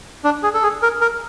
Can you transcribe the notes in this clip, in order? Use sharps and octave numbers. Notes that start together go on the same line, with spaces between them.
D4
G#4
A4
G#4
A#4
A#4